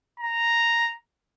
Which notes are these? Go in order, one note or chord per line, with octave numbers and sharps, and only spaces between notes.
A#5